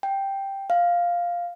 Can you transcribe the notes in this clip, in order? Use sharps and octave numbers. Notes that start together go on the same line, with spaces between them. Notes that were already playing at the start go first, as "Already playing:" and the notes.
G5
F5